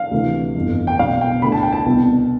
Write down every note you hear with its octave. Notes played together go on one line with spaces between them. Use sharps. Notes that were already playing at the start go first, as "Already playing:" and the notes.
Already playing: F5
D2 C3 E3
G1 F2 E3
G5
B1 B2 F5
G5
D2 D3 B5
A5
G5
A5
C2 B2